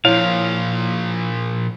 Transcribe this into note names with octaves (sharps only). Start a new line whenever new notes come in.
A#2 F3 E4 C#5 F5